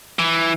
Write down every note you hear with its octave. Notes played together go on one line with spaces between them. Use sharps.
E3